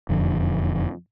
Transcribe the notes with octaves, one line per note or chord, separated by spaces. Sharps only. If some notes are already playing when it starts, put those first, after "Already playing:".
E1 F2 D3